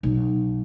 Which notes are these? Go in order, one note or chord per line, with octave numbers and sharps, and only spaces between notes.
B1